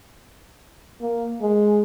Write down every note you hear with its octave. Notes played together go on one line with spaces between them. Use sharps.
A#3
G#3